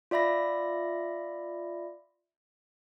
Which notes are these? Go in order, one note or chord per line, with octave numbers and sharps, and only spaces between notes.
F4 D5 E5 B5 A#6